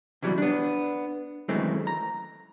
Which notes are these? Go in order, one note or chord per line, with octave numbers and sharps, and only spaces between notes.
C3 E3 F#3 G3
B3 D4
F#2 D#3 E3 G#3 A3 C4
A#5